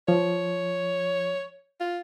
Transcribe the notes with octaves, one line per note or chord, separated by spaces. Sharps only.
F3 C#5
F4